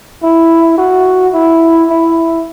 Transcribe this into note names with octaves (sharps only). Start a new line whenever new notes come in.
E4
F#4
E4
E4